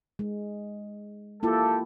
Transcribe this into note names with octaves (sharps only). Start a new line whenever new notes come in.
G#3
A#3 E4 F4 G4 A4